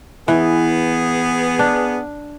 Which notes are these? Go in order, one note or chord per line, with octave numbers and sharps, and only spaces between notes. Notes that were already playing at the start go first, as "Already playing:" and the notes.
E3 B3 G#4
D4